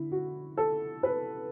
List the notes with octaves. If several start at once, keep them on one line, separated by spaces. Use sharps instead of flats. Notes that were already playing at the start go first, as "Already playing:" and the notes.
Already playing: D3 E4
F#4
A4
B4